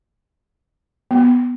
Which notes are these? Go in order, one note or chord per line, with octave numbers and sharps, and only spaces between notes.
B3